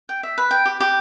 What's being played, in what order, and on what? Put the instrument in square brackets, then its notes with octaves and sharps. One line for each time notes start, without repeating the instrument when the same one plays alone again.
[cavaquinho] G5
E5
B4
G5
G4
G4